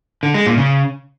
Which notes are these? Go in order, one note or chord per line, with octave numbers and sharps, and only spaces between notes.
D3
G#3
A#2
C#3